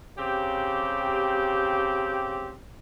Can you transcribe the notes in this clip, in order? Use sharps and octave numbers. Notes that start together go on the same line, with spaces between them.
C#3 C4 G4